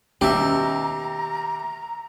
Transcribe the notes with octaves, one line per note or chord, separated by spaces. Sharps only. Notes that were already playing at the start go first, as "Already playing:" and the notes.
D#2 B2 G3 C#4 G4 E5 A#5